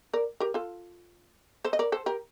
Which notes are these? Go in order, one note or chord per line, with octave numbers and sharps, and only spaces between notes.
A#4 D5
G4 A#4
F4 A4
A4 C5
D#5
A#4 D5
A4 C5
G4 A#4